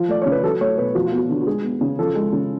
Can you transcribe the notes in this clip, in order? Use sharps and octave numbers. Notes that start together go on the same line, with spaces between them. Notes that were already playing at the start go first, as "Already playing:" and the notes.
Already playing: F3
A3 D5
C#3 C#5
B4
F#3 A4
A3 C#5
B2 B4
F3 F#4
F4
B3 F#4
D3
F#4
G#3 G#4
B3
C#3
F3 A4
G#3
C#3